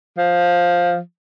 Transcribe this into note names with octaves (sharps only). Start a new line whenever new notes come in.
F3